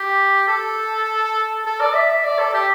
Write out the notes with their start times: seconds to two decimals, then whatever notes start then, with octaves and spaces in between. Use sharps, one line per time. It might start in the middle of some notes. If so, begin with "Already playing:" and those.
Already playing: G4
0.48 A4
1.66 A4
1.81 D5
1.95 E5
2.10 E5
2.24 D5
2.39 A4
2.54 G4